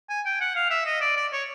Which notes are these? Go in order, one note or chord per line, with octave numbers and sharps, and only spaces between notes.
G#5
G5
F#5
F5
E5
D#5
D5
D5
C#5